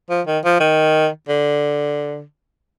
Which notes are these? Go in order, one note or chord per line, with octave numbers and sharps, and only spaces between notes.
F3
D#3
F3
D#3
D3